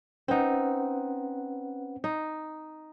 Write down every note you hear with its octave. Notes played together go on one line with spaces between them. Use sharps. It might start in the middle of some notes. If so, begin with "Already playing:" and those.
C4 C#4 D#4 B4 F#5
D#4